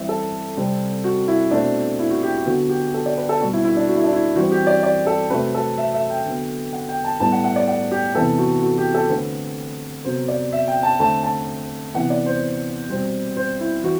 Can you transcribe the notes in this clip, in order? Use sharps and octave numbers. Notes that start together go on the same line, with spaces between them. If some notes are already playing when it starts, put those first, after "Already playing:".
Already playing: E3 G3 C4 E5
A4
C3 G3 C4
F#4
E4
B2 A3 C4 D4
E4
F#4
G4
G4
D3 F#3 B3 F#4
G4
A4
D5
B4
A4
B2 G3 C4 F#4
E4
E4
D4
F#4
E4
D4
E4
E3 G3 C4 F#4
G4
D5
D5
A4
C3 F#3 A3 C4 B4
A4
E5
E5
G5
D3 F#3 B3
F#5
G5
A5
A2 G3 B3 A5
F#5
F#5
D5
F#5
G4
C3 E3 B3 A4
F#4
F#4
G4
A4
D3 A3 C4 B4
C3 F#3 B3 C5
D5
E5
G5
A5
D3 A3 C4 A5
A5
C3 E3 B3 F#5
D5
C5
B2 G3 C4
C5
E4
E3 F#4